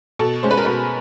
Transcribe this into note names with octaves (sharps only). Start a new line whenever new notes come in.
B2 A4
G#3 C#4 C5
B4
A#4
B2 B4